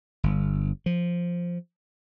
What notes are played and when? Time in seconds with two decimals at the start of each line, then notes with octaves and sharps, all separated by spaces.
0.23 G1
0.86 F3